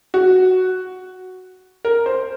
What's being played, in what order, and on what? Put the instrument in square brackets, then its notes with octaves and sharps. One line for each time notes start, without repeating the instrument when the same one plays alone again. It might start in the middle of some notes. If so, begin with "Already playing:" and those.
[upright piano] F#4
A#4
C5